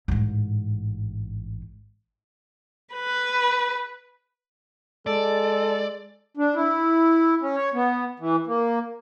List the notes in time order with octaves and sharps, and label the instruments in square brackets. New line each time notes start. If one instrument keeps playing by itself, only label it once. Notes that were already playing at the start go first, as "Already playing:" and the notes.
[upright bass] A1 G#2
[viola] B4
[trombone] G#3 [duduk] A4 [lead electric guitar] D5
[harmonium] D4
E4
C#4
C#5
B3
E3
A#3